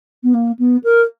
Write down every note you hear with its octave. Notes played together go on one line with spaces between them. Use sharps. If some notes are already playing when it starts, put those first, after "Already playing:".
B3
A#3
B3
A#4